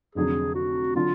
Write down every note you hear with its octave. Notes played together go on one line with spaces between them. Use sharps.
F1 F2 D3 F#3 G#4
F#4
D3 F#3 F4